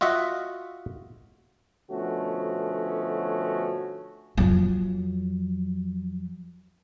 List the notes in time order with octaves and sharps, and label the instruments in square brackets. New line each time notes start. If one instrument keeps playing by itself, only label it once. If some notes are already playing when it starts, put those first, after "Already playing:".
[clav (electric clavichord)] F4 F#4 D#5 E5 F#5
[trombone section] B2 D3 F3 A3 C#4 F#4
[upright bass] F2 F#3